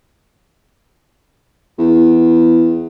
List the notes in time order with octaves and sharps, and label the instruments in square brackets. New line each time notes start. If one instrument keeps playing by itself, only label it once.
[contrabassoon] E2